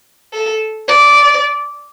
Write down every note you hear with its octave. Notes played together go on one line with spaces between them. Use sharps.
A4
D5